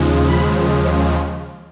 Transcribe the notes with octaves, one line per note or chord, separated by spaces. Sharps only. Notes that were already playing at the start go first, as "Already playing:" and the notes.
Already playing: D#2 C#3 F3 G#3
B5